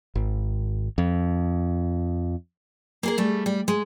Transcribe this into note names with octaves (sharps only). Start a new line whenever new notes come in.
G#1
F2
A#3 G#4 A#4
G3 A3
G3
G#3